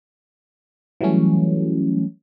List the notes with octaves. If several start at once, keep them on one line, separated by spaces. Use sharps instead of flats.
E3 F#3 G3 A3 C#4